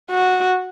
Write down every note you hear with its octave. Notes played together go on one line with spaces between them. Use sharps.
F#4